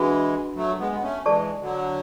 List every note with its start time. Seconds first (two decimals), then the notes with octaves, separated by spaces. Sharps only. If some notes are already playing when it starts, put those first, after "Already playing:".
Already playing: E3 G#3 D4 F#4 B4 F#5 B5
0.56 F#3 A3
0.79 G#3 B3
0.92 B3
1.02 A3 C#4
1.26 E3 G#3 A4 D5 A5 C#6
1.61 D3 F#3